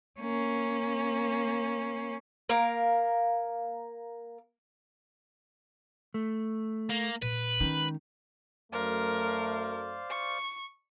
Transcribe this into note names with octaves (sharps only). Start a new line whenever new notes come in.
A#3 C#4
A#3 A#4 F5
A3
A#3
A#2 B4
D#3 G#3 C#4
F#2 A3 A#4 C5 D5 F5
C#6